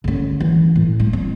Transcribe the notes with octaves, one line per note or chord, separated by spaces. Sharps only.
D3 C#4
E3
A2
G#3
C4